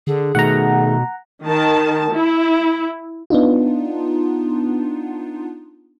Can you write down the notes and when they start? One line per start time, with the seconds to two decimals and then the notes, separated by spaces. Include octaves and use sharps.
0.07 D3 G#4
0.35 B2 D#3 A3 F#5 A#5
1.46 D#3 A5
2.13 E4
3.30 B3 D4 D#4 F4